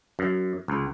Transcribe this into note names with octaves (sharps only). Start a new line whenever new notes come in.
F#2
C#2